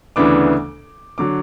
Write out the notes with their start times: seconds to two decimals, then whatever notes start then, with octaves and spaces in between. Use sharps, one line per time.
0.16 D2 C#3 E3 B3 D4 D6
1.18 D3 F#3 D6